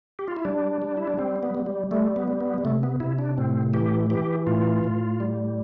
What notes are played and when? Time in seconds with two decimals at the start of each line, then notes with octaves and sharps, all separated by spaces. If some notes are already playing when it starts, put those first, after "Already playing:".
0.19 G4
0.28 F4
0.37 E4
0.45 G3 D4
0.82 G3
0.97 E4
1.07 D4
1.18 G3 C4
1.43 B3
1.55 G3
1.66 G3
1.91 G3 A3
2.16 B3
2.28 G3
2.41 B3
2.58 G3
2.65 C3 A3
2.83 B3
3.00 C3 E4
3.19 D4
3.37 A2 C4
3.74 E3 G4
4.10 E3 G4
4.47 A2 F4
4.84 A2
5.20 G3